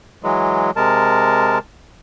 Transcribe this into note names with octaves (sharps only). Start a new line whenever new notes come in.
E3 F#3 G#3
C3 G#3 A#4 A5